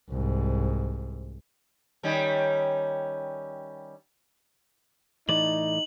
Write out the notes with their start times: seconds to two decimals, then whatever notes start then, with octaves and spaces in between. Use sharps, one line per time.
0.10 C2 G#2
2.03 D#3 G3 C#4
5.29 A2 E3 D#4 D5 F#7